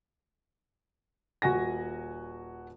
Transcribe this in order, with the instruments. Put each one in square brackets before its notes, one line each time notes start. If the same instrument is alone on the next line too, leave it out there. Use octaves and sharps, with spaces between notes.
[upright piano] D#1 F#4 G#5 A#6